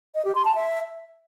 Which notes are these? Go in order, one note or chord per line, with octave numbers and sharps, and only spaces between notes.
D#5
G4
C6
A5
E5